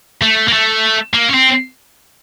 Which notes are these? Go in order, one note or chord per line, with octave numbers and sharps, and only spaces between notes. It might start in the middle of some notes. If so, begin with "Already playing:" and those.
A3
A#3
A3
A#3
C#4
C4